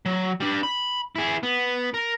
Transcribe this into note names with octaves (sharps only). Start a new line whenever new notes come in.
F#3
G3 D4
B5
E4 G#4
B3
A#4